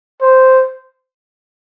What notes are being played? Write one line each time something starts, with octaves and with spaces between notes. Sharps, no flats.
C5